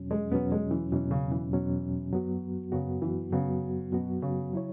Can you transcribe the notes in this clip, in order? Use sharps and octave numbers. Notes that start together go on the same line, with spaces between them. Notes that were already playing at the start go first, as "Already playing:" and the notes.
Already playing: E2 B2 F#3 C#4
G#3
E2 B2 F#3 B3 C#4
G#3
E3
E2 B2 E3 F#3 C#4
C#3
E3
E2 B2 F#3 C#4
F#2 F#3 B3 F#4
F#2 C#3 F#3 B3 F#4
E3
F#2 C#3 F#3 B3 F#4
F#2 B2 F#3 B3 F#4
C#3
F#3 E4 C#5